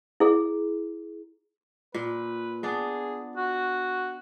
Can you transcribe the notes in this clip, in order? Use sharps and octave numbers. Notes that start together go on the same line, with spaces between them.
E4 G#4
A#2 B4
B3 D4 G#4
F#4